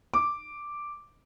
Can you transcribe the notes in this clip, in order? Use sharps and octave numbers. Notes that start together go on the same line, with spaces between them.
D6